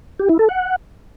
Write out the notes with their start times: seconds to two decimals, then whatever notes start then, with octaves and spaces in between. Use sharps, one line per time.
0.19 G4
0.29 E4
0.39 A4
0.49 F#5